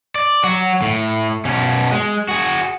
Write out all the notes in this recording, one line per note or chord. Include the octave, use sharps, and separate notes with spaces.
D5
F#3 F#4
A2
B2 C#4
G#3
F#4 G#4